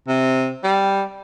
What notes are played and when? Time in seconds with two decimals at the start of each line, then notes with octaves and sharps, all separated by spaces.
0.08 C3
0.64 G3